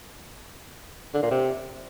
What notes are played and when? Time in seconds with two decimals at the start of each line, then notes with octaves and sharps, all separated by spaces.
1.14 D3
1.23 A#2
1.31 C3